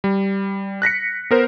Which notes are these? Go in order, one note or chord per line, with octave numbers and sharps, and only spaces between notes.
G3
F#6 A#6 B6 C#7
B3 A#4 C5